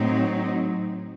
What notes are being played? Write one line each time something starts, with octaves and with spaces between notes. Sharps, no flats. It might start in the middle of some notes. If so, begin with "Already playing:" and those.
Already playing: A2 F#3 C4 D#4